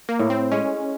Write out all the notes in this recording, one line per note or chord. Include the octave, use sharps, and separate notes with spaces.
A#3
A2
C4
G#3 C#4